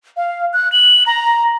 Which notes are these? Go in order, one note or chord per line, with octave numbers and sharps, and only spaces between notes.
F5
F#6
F#7
A#5